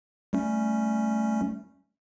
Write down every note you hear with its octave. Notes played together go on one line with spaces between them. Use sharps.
G3 A3 C#4